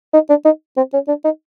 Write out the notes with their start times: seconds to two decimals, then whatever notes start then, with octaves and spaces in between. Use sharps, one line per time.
0.13 D#4
0.29 D4
0.45 D#4
0.77 C4
0.93 C#4
1.08 D4
1.24 D#4